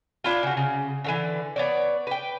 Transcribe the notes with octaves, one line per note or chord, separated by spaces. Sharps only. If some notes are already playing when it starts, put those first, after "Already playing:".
D4 E4 F4
C#3 F#4
C#3
B2 D3 E3
B3 C#5 D5
B4 G5